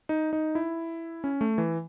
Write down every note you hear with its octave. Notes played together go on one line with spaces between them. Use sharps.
D#4
D#4
E4
C#4
A3
E3